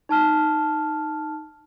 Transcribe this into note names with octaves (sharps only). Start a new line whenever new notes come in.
D#4 A5 F6